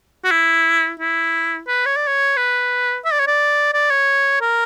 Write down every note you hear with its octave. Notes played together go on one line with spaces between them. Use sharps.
F#4
E4
E4
B4
C#5
D5
C#5
B4
E5
D5
C#5
D5
D5
C#5
A#4